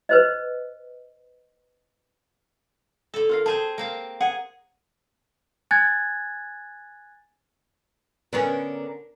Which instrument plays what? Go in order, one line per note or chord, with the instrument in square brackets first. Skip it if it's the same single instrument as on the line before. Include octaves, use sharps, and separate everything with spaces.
[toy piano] B4 C5 D#5
[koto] D3 A4
[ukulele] F4 A#4 F5
[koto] C4 G#4 C5 [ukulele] A5
[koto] A#3 C4 F5
[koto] G#4 [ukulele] F#5
[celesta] G#5 F#6 G#6 A6
[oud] D3 B3 C#4 [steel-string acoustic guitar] A#4